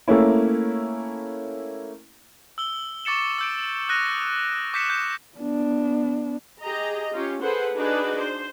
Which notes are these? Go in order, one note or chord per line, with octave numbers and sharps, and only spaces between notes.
A3 A#3 C#4 E4
E6 G7
C#6 D6 A6 C#7 E7
E6 G6 D7
D#6 F#6 A#6 D#7
D6 G6 B6 C#7 E7
G6 E7
B3 D4
G4 G#4 D#5 A#5
C#4 F4 G4
G#4 A4 B4 C5 F#5
D4 D#4 F#4 G#4 B4 D5
C5